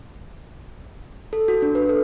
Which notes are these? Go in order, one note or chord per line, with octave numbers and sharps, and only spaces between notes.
A4
F#4
D4
B4
A4